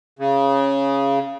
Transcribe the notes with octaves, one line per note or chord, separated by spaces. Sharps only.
C#3